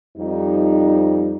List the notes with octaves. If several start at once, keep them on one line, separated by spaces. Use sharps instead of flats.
F2 G3 D#4